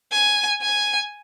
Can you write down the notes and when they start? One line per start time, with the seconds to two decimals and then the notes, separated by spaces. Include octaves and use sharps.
0.12 G#5
0.61 G#5